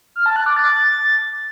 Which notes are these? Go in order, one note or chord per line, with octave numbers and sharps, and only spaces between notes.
F6
A5
F#6
D6
A6